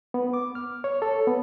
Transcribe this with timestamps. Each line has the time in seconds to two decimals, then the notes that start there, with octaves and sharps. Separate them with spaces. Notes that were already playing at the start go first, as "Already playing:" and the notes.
0.14 B3
0.33 D6
0.55 F6
0.84 C#5
1.02 A4
1.27 B3